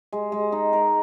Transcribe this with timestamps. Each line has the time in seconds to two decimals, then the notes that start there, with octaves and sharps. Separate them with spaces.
0.12 G#3
0.32 G#3
0.52 D#4
0.73 A#4